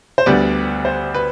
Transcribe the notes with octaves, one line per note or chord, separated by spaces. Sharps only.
C5
D2 D3 G3 B3 D5
C5
B4